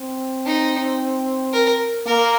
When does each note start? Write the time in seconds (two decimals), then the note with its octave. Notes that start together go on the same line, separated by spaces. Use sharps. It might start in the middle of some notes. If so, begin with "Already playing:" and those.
Already playing: C4
0.46 D#4
1.53 A#4
2.06 A#3 A#4